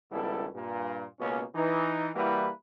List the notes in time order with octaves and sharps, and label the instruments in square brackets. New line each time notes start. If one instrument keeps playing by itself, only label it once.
[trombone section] G#1 C#2 G3 B3 E4 A4
G2 A#2
C#2 B2 A#3 C#4
E3 D#4
E3 G3 A#3 E4 F#4 B4